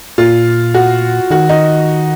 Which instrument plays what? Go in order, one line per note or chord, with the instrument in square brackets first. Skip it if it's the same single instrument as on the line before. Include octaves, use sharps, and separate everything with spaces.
[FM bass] A#2 [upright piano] F4
[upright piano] F#4
[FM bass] D#3 [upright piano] F#4
[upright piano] D#4